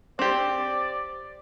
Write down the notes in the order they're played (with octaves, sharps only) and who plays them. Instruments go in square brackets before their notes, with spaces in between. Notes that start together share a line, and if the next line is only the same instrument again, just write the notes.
[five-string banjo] C4 G4 [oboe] D5